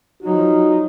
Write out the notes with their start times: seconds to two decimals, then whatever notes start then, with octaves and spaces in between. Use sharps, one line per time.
0.23 F3 F#3 D#4 F#4